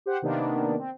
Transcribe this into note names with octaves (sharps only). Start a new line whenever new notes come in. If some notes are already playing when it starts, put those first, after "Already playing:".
G4 C5 F#5
C3 D#3 A#3 B3 D4
C4